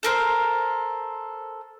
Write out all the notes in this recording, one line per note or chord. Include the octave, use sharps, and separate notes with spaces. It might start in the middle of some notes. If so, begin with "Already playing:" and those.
A4 A#4 C5